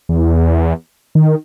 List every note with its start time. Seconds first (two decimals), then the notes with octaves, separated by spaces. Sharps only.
0.09 E2
1.15 D#3